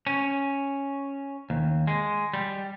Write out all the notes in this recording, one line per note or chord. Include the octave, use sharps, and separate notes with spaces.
C#4
D#2
G#3
G3